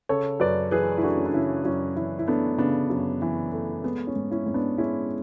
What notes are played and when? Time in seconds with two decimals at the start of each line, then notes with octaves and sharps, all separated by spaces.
0.09 C#3 A4 C#5
0.40 F#2 B4 D5
0.71 E3 G#4 B4
0.98 E4
1.03 A3 D4 F#4
1.17 C#4
1.26 D4
1.34 C#3 C#4 E4
1.65 F#2 C#4
1.96 E3 C#4 E4
2.19 E4
2.28 A3 B3 D4
2.58 C#3 B3 D4
2.90 F#2
3.22 E3
3.53 A3
3.84 G#3 B3
4.07 C#4
4.16 G#2
4.31 C#4 E4
4.46 G#2
4.54 B3 D4
4.78 G#3 C#4 E4